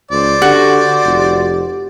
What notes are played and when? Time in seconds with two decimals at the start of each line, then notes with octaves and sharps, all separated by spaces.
0.11 C#2 C5 D5
0.42 D3 F#4 G4
1.05 F1